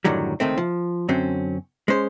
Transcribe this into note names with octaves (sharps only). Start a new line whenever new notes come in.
F#2 A2 D3 D#3 F#3 G3
C#2 D#3 A3 C4
F3
F#2 D3 F#3 C4 C#4
G#3 C#4 C5